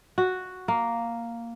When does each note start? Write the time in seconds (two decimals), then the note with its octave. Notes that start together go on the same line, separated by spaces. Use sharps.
0.18 F#4
0.68 A#3